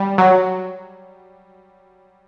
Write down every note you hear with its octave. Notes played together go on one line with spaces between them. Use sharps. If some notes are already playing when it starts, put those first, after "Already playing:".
Already playing: G3
F#3